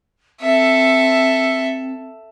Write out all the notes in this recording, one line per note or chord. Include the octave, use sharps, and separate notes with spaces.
C4 A4 E5